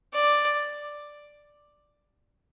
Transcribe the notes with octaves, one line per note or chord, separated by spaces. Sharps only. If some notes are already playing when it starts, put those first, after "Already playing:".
D5